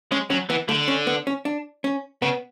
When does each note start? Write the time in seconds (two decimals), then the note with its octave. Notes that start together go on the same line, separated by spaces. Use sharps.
0.11 G#3 C#4
0.30 F#3 C#4
0.50 E3 B3
0.69 D3 A3
0.88 C#4
1.07 B3
1.27 C#4
1.45 D4
1.84 C#4
2.22 C#3 B3